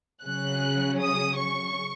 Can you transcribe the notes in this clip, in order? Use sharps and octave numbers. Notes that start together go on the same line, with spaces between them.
C#3 F#3 C#4 F#6
D#6
C#6